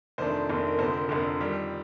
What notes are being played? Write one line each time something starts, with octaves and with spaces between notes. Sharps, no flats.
F1 F2 D#3 A3 D4 C5
F1 F2 D#3 A3 D4
A#4
F1 F2 D3 C5
A#4
F1 F2 D3 A#4
F2 D#3 G3